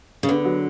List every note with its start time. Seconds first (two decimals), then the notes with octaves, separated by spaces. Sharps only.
0.23 C#3
0.29 D3 B3
0.45 F#3